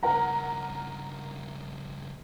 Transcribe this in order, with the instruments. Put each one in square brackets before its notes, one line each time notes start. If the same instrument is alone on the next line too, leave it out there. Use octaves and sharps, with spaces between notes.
[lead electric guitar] G2 C#3 [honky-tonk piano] A#4 F#5 A#5